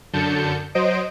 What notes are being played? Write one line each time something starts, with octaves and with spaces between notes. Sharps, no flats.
F#2 D3 A5 G6 C#7
F#3 C5 D#5 D7